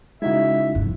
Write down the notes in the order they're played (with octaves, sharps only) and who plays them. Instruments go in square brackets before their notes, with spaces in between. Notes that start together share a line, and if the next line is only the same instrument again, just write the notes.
[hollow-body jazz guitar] C#3 E4 [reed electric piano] G#3 D#4 F#4 [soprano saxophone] E5
[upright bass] F2 G#2